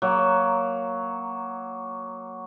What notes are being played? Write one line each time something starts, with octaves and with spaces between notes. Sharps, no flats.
F#3 A#3